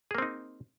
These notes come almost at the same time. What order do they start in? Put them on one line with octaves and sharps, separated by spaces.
G#4 A#3 C4 D#4